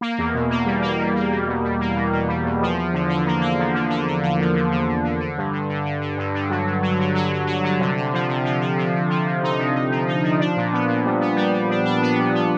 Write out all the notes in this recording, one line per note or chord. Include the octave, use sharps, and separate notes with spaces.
A#3
E2
B2
A#3
G3
A#3
G3
A#3
G3
B2
G3
A#3
B2
B2
G3
E2
F3
F3
D3
D3
A#3
A#3
F3
D3
D3
D3
D3
F3
D3
D3
D3
D3
D3
G2
D3
D3
D3
D3
G2
D3
F#3
D3
F#3
D3
F#3
F#3
F#3
D3
C3
C3
F3
C3
F3
F3
C3
C3
F3
C3
D#4
C3
D#4
F3
D#4
F3
D4
A#2
B3
A#2
G3
B3
G3
G3
D4
D4
B3
A#2
B3